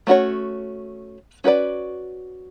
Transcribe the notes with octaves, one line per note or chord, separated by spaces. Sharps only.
A3 C#4 F#4 A#4 C#5
C#4 F#4 B4 D5